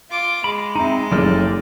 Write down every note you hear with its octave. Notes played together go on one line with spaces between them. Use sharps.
F4 D6
G#3 B5
C4 D#4 E5 A#5
F#1 C#3 G4 A4 D5 F6